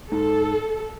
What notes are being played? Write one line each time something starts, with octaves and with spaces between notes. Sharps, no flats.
G#2 A4